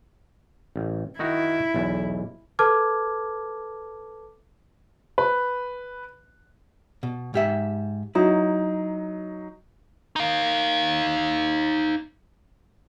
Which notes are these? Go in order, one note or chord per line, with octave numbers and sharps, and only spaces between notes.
A1
D#3 D#4 E4 F#4
B1 E2
A4 B4 A5 D6 F6 G#6
B4
B2
G#2 G4 E5
F#3 D#4 E4
D#4 F5